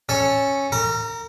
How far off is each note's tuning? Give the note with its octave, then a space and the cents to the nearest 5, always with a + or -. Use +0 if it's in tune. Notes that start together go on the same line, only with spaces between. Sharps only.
C#4 -5 A4 +0
A#4 -35 A#5 +0